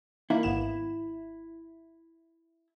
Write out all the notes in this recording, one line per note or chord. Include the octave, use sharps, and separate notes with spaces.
D#3 A#3 E4
G#1 B3 E7